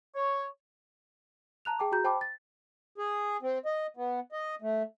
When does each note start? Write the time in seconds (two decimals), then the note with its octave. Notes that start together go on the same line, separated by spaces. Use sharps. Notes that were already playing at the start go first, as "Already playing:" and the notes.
0.15 C#5
1.65 A5 A#5 F#6 F7
1.79 G#4 G5 A5 D6
1.92 F#4 G#4 A#5 G6
2.04 C5 G5 A5 B5 D6
2.21 A6
2.98 G#4
3.42 C4
3.66 D#5
3.97 B3
4.32 D#5
4.62 A3